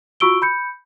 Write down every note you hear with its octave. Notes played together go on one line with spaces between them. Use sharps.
F4 F#4 C#6 E6 D7 G7
B5 G6 C#7